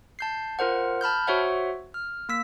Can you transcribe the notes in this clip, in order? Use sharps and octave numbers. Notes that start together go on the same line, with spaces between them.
A5 G6 C7
F4 A#4 C5 F#5
A5 B5 F6 G6
F#4 C5 C#5 E5 F#5
F6
A#3 E6 B6